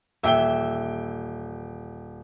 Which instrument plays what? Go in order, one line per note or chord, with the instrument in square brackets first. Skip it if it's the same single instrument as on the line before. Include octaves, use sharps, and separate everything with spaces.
[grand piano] D#1 G5 G7 [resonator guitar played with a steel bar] E3 E5